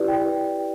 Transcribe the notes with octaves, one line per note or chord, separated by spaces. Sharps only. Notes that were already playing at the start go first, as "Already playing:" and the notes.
Already playing: E4 G4 B4 D5
G5